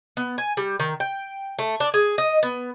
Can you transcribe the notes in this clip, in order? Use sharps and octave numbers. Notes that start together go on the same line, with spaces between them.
B3
G#5
G3
D#3
G5
A3
D4
G#4
D#5
B3